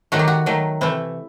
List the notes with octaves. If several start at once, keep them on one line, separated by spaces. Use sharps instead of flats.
D#3 F#3 A3 F#4
G4
F#4
D#3 F#3 A3
C3 E3 A3 E4